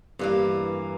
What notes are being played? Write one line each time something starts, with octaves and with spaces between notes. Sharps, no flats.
G2 E3 A#3